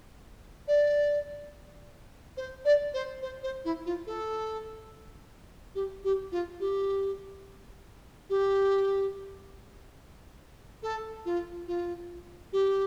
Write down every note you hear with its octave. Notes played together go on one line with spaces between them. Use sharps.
D5
C5
D5
C5
C5
C5
E4
F4
A4
G4
G4
F4
G4
G4
A4
F4
F4
G4